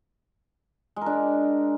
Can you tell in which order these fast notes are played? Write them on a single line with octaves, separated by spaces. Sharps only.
G#3 A#4 D4